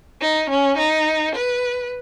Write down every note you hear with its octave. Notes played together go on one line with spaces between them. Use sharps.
D#4
C#4
D#4
B4